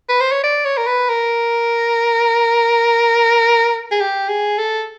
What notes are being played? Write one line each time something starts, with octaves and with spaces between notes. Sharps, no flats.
B4
C5
C#5
D5
C#5
A#4
B4
A#4
G#4
G4
G#4
A4